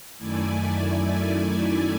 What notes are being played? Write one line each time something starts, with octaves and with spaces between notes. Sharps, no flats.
F#2 D#3 A3 E4 D5 G#5